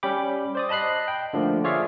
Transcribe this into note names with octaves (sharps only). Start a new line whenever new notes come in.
G3 C#4 G5 B5 D6
C5 D5 D#6
D#5 A5 B5 F#6 C7
G5
D3 F3 A3 A#3
F4 G#4 C#5 D5 E5 F5